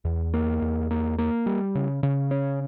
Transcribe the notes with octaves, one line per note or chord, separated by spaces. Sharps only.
E2
A#3
E2
A#3
A#3
G3
C#3
C#3
C#4